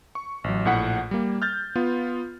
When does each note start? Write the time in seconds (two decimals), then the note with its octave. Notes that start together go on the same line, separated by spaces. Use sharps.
0.15 C#6
0.44 A1 F#3
0.65 A#1 A2 F#5 B6
1.11 G3 A#3
1.42 F6 G6 A6
1.75 B3 F4